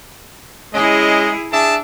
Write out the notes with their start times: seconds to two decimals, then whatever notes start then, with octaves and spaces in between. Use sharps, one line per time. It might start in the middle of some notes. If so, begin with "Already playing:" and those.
0.74 G#3 C#4 E4 G#4 D#5
1.52 D4 G#4 E5 A5